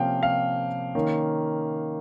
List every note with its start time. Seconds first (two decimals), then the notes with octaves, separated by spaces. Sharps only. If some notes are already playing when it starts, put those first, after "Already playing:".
Already playing: C3 F3 A#3 C#4 F5 G5
0.23 F5
0.95 D#3 A#3 C#4